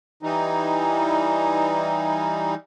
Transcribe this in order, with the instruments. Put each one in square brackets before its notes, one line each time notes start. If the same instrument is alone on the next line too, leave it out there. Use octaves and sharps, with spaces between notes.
[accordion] E3 G3 D#4